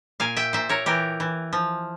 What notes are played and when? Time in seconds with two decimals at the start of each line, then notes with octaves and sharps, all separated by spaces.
0.20 A#2 F5 G#5
0.36 E5 G5
0.53 A#2 C5 E5
0.69 A#4 C#5
0.86 E3 G4 A#4
1.20 E3
1.53 F3